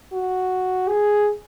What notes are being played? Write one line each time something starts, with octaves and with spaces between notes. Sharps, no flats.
F#4
G#4